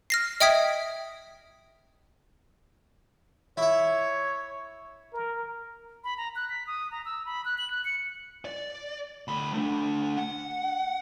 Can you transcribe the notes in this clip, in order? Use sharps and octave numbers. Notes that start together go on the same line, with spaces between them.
F6 A#6 C7
D#5 E5 G5 D#6 G#6 B6
E4 C#5 E5
A#4
B5
A#5
F#6
B6
D#6
A#5
E6
B5
F#6
F#7
F#6
C#7
D5
D2 B5
A3 D4
F#5